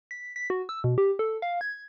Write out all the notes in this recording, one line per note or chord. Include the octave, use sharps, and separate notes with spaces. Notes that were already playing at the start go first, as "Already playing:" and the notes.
B6
B6
F#4
E6
B2
G4
A4
F5
G#6